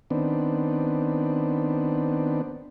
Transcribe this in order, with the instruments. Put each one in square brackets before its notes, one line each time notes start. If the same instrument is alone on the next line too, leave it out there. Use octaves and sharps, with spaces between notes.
[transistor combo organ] D#3 B3 C4 D4